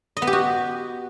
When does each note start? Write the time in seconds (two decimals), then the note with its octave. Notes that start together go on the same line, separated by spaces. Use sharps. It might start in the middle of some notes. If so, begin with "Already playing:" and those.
0.17 D#5
0.22 B3
0.27 G4
0.33 F#4